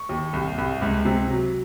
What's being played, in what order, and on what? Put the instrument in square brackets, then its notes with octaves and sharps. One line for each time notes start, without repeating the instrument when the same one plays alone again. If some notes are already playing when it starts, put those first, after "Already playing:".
Already playing: [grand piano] C#6
D#2
C2
C2
C#2
C3
F#3